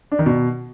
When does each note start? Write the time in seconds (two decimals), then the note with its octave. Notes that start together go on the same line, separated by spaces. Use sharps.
0.12 D4
0.19 D#3
0.26 B2